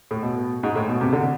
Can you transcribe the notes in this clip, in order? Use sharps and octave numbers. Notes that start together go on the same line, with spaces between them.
A2
B2
G#2
A2
B2
C3
D3